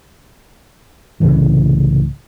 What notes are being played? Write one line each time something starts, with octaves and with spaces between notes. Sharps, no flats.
C2 A2 C#3 E3